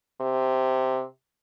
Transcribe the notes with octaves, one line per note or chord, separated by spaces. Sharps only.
C3